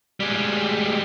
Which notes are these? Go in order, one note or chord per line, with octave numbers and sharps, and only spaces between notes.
G3 G#3